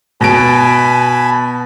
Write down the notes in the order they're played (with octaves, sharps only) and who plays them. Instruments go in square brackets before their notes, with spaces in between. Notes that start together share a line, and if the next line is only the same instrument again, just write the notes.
[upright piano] B2 D7 [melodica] G#5 A5 B5